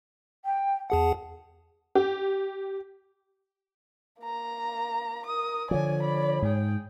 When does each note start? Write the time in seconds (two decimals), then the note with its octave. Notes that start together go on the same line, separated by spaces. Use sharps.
0.45 G5
0.90 E2 G#4 F#5 A5
1.95 G4
4.21 A#3 A#5
5.26 A#4 D#6
5.71 D3 F3 C#5 D5 G#5
6.00 D5 B5
6.42 G#2 G#4 G5